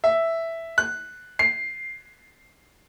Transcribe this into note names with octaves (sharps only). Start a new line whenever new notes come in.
E5
F#6
C7